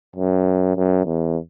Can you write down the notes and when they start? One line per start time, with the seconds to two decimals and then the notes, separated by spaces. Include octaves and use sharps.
0.16 F#2
0.76 F#2
1.06 E2